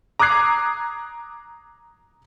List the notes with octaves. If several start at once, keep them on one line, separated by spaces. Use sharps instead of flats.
A#5 D6 D#6 F#6 G#6 C7